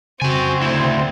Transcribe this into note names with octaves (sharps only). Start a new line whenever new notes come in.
C#3 C4 F#4 G#5
D2 E4